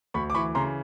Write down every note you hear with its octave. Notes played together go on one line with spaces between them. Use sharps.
D2 B5 C#6
D6
E3 B5 C#6
C#3 A#5 C6